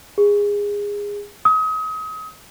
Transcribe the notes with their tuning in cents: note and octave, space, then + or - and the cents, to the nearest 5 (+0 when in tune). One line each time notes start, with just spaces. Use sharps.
G#4 -20
D#6 +35